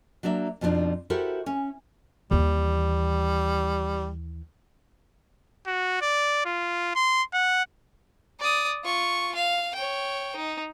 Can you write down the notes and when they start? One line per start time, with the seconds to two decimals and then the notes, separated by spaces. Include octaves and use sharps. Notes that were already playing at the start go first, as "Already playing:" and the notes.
0.23 F#3 A#3 D4 E5
0.61 F2 B2 F3 G3 D4 D#4
1.10 E4 F#4 G4 A4 A#4 C5
1.46 C#4
2.31 D#2 E3 G3
5.67 F#4
6.02 D5
6.45 F4
6.95 C6
7.34 F#5
8.40 D5 D#6
8.84 F4 C#6
9.35 F5
9.75 C#5 G5
10.36 D#4